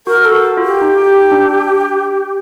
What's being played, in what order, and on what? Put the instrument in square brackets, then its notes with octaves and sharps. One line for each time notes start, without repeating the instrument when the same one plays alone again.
[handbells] F#4 [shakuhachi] A#4
[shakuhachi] A4
[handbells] F#4
F4
[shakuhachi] G4
[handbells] D#4
D4